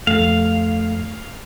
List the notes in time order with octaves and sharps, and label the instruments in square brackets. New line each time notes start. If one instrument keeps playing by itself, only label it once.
[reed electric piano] F2 A3 [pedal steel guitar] F5